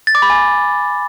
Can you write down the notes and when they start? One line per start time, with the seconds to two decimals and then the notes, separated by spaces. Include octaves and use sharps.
0.07 A6
0.15 D6
0.22 B5
0.30 G#5